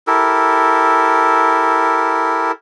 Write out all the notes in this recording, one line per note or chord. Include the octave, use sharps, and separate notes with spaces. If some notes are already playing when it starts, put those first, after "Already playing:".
E4 G4 A4 A#4